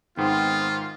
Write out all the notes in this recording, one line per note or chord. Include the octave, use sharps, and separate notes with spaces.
G#2 D#3 B3 C4 F4